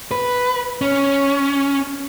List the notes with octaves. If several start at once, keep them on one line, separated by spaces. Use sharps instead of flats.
B4
C#4